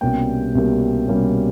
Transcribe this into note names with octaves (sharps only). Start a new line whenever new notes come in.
C2 B2 G3 A#3 C#4 G5
C2 B2 G3 A#3 C#4
C2 B2 G3 A#3 C#4